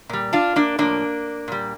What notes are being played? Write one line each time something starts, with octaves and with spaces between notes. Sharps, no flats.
A#2 G3
D4 F4
A#3 D4
A2 F3 A#3 D4
A#2 G3